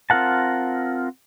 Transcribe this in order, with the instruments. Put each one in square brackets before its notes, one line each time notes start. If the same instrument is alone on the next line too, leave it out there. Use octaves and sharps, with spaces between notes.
[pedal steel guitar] C4 F4 A#4 F#5 A5